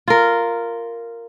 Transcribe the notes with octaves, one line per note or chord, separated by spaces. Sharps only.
F4 A#4